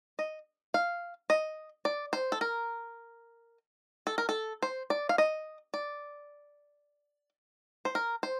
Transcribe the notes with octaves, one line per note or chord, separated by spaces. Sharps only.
D#5
F5
D#5
D5
C5
A4
A#4
A4
A#4
A4
C5
D5
F5
D#5
D5
C5
A#4
C5